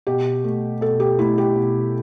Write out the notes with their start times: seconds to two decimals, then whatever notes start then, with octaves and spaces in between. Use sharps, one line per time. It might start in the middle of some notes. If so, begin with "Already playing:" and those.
0.07 B2 G4
0.44 A3
0.81 B2 A4
1.00 G4
1.18 A3 E4
1.38 G4
1.56 B2